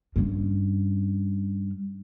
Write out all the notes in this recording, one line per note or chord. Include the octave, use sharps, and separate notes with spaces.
G2 C#4